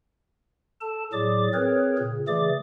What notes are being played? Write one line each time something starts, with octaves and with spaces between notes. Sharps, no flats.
A4 A5
A2 F#3 G#4 D5 D6
C4 G#4 A#4 B4 C#5
A#2 C#3
C#3 E3 A3 G#4 D5 D6